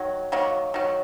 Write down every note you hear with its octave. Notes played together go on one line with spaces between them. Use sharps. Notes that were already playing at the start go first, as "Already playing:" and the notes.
Already playing: D#3 F#3
D#3 F#3 A#3
D#3 F#3